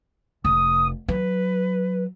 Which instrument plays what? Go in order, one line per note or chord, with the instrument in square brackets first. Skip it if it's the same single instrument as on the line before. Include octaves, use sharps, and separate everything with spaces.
[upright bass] F1 [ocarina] D#6
[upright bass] F#3 [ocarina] B4